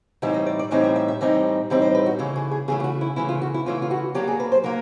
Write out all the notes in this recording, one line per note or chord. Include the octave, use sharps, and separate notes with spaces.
A2 E3 G3 C4 D#4 E5
D#5
D5
D5
A2 E3 G3 C4 D#4 D#5
E5
E5
E5
A2 E3 G3 C4 D#4 D#5
A2 E3 G3 C4 D#4
C5
B4
F#4
C#3 E3 A3
G#4
G#4
C#3 E3 A3 G#4
G4
F#4
E4
C#3 E3 A3 E4
F4
F#4
E4
C#3 E3 A3 F4
F4
F#4
F#3 A#3 D4 G4
G#4
B4
C5
F#3 A#3 A#4